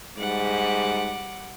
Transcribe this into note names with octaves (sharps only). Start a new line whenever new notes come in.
G#2 G3 F#5 D6